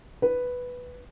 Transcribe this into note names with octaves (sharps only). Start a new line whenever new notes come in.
B4